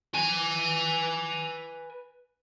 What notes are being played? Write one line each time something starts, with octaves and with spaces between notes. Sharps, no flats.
B4 G#5